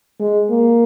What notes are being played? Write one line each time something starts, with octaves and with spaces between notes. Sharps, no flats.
G#3
A#3